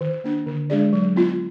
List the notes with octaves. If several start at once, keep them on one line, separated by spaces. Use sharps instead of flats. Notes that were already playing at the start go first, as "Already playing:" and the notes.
D#3
A#3 D4
D3
G#3 D4 G#4 D5
F#3
B3 F4